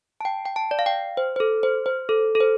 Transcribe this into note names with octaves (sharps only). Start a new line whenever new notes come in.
A5
G5
G5
A5
D5
F5
G5
C5
C5
A4
C5
C5
A4
A4
C5